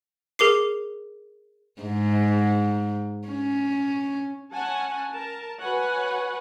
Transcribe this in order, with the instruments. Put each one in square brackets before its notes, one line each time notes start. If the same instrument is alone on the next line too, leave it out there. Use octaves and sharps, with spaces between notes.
[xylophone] G#4 A#4 D6 C7
[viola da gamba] G#2
C#4
[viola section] C#4 F#5 G#5 A5
A#4 A5
F#4 B4 C#5 F#5 G#5